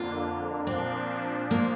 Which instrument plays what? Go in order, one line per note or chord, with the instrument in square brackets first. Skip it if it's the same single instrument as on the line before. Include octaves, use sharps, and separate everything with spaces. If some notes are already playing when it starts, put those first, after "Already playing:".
Already playing: [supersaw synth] F2 D3 A#3 D4 [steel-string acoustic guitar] F4
[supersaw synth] A#2 F3 D4 [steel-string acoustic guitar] C4
[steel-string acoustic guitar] A#3